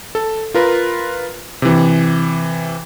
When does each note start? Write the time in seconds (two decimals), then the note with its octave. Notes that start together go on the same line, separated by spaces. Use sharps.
0.15 A4
0.54 F4 A#4 B4
1.62 C3 E3